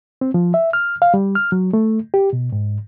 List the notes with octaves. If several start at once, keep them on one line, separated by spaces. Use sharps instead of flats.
C4
F3
E5
F6
F5
G3
F6
F#3
A3
G4
B2
G#2